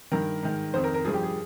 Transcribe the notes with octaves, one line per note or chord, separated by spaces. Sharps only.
G2 D#3 A#4
G#2 D#3
F2 D#3 C5
A#4
A#4
G2 F3 G#4
G4
G#4